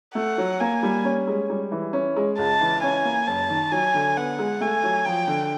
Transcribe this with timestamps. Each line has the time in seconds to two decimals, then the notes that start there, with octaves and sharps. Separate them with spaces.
0.15 A3 F#5
0.38 F#3
0.60 A#3 G#5
0.83 G3
1.05 C#4
1.27 G#3
1.50 G3
1.72 E3
1.93 C#4
2.16 G#3
2.38 C#2 A5
2.61 E3
2.83 C#4 G#5
3.05 A#3
3.27 F#1 A5
3.49 D#3
3.72 F#3 G#5
3.94 D3
4.16 B3 F#5
4.39 G#3
4.61 A3 G#5
4.83 F#3
5.05 F3 G5
5.27 D3